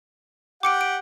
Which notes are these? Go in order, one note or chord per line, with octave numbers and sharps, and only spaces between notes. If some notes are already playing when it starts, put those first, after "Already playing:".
G4 F#5 G5 D6 C#7 D7
D7